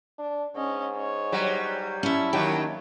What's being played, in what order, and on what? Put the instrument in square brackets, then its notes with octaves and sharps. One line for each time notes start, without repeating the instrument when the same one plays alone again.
[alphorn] D4
[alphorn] G#2 [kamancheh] C#4 D#5
[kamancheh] C#5
[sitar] F#3 G3
[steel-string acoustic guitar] C#4 E5 [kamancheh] E4 A5
[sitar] D#3 F#3 G4 [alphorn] A#3 [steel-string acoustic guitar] G5